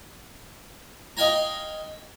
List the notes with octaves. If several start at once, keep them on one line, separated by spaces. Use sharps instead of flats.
D#5 F5 G5 G#5 A#5